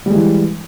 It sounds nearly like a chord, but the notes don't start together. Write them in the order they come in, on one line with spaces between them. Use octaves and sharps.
G3 G#3 E3